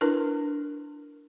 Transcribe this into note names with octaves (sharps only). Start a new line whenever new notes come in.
D4 E4 A#4 B4